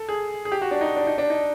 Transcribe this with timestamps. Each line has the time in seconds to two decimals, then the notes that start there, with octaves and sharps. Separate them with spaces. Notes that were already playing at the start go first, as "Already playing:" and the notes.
Already playing: A4
0.09 G#4
0.45 G#4
0.52 G4
0.62 F#4
0.71 D4
0.81 D#4
0.96 D4
1.07 D#4
1.18 D4
1.30 D#4